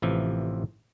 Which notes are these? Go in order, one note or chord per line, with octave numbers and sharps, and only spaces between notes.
A1 C3 E3 F3